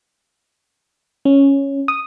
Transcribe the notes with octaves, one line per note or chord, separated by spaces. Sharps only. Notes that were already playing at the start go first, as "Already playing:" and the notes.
C#4
D#6